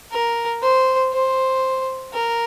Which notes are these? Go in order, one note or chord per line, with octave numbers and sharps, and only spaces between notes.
A#4
C5
C5
A#4